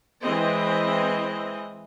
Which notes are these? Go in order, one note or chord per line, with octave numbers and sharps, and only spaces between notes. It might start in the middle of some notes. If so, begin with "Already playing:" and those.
E3 G#3 C4 D#5